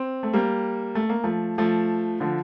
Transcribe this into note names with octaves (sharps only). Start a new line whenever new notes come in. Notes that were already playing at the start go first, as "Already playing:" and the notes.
Already playing: C4
A3
G3 A#3
A3
A#3
F3 A3
F3 A3
D3 F3